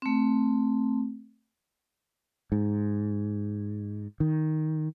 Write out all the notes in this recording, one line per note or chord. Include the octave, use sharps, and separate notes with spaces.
A3 C4
G#2
D#3